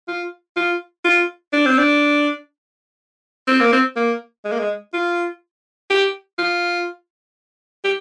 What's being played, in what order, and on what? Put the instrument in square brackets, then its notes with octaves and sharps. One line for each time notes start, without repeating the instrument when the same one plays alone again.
[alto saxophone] F4
F4
F4
D4
C4
D4
C4
A#3
C4
A#3
G#3
A#3
G#3
F4
G4
F4
G4